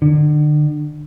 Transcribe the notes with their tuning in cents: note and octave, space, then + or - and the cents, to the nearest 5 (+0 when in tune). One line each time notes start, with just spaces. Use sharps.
D3 +35